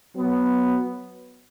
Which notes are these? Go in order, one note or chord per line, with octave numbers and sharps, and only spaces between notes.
F#3 B3